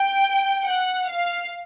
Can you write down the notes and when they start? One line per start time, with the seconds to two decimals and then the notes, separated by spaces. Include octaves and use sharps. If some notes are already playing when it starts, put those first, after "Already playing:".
Already playing: G5
0.64 F#5
1.08 F5